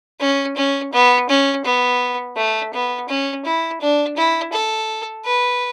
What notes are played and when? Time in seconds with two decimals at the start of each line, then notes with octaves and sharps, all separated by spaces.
0.20 C#4
0.56 C#4
0.92 B3
1.29 C#4
1.65 B3
2.37 A3
2.73 B3
3.08 C#4
3.45 E4
3.81 D4
4.16 E4
4.52 A4
5.24 B4